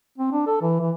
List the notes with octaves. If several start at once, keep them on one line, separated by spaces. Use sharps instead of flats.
C4
D4
A4
E3
E3